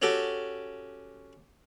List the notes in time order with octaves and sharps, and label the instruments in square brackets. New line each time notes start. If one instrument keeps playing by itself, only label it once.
[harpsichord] C#4 F#4 G4 A4